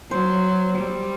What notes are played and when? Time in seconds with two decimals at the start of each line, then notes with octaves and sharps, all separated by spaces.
0.11 F#3 C5
0.77 G3